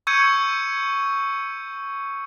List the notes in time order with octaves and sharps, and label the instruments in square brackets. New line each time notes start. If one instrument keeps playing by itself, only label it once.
[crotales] C#6 E6 G6 G#6 C#7 D#7